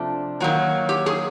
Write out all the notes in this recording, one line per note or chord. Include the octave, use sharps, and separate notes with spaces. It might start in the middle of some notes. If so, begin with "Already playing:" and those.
Already playing: C3 F3 A3 D4
D#3 F#3 A#3
G4
G#4